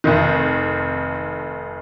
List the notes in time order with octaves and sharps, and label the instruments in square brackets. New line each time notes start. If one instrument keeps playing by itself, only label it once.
[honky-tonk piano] F1 F2 D#3